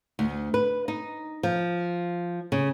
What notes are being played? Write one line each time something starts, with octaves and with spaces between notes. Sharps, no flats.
D2
B4
D#4
F3
C#3